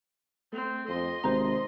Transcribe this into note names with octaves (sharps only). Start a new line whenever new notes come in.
A3 C4
F2 D#5 C6
G#1 C3 C5 A#5